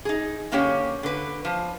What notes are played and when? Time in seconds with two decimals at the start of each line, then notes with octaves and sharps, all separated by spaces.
0.05 D#4 G#4
0.52 D3 A#3 C#4 G4 C#5
1.03 D3 B4
1.45 F3 C5